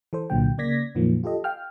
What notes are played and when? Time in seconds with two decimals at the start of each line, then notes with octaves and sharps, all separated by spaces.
0.13 E3 A4 C5
0.30 C2 A#2 D3 F#3 G5
0.58 C#3 A#3 D5 G#6 A#6 B6
0.95 F2 A#2 D#3 F3 F#3 A#3
1.24 F4 G4 A4 D#5
1.44 F5 G5 F6